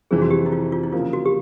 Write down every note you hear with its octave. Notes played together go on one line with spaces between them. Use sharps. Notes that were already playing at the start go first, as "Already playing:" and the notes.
F2 C3 E3 G#4
F#4
G4
E4
F4
F4
E4
C#3 F3 A#3 F4
F#4
G4